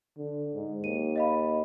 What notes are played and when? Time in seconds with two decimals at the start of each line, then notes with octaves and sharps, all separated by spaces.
0.18 D3
0.55 G#2
0.84 D#2 D#7
1.16 D#5 F5 B5